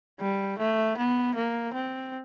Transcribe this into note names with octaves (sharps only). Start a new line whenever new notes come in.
G3
A3
B3
A#3
C4